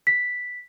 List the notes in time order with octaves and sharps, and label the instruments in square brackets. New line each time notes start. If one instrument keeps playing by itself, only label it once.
[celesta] B6